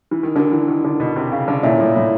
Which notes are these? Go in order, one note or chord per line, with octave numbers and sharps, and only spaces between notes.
E3
D#3
D3 D4 F#4 A#4
E3
D#3
D3
B2
C3
C#3
D3
A#2 E4 A4 C#5 E5
A2
A2